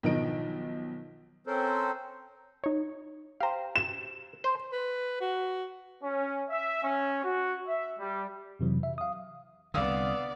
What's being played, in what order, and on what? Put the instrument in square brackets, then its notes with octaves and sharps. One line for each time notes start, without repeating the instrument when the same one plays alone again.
[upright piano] B1 D#3 F3 D#5 D7
[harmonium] C4 C#4 A4 A#4 C5
[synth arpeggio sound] D#4 C#5
[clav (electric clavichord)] G4 C5 [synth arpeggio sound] F5 A#5
[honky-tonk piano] E7
[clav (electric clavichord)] C5
[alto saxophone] B4
F#4
[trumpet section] C#4
E5
C#4
F#4
E5
G3
[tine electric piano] F2 C3 E3 F#3
E5
F5 D#6
[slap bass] C2 D3 [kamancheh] B3 D5 [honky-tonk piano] F5 D#6 E6